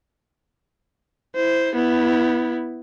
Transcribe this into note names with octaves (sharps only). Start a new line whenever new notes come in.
E4 C5
B3 E4